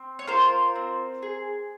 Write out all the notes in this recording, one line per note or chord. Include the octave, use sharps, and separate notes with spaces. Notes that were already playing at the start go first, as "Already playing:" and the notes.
Already playing: C4
C#5
F4 A#4 C5
C4
G#4